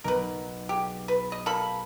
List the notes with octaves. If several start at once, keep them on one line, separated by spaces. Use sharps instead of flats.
B1 A#4 B4
G4 G#4
B4
D#5
A#3 A4 B5